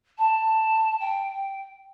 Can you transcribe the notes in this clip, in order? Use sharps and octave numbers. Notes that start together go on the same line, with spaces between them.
A5
G5